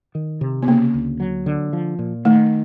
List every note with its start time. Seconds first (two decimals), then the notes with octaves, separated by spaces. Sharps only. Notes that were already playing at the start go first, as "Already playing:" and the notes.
0.15 D#3
0.41 C3
0.63 B3
0.67 C#3 A#3
0.94 D2
1.20 F#3
1.46 D3
1.73 F3
1.99 A#2
2.25 D#3 A3